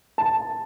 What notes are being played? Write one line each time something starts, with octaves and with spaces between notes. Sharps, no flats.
A5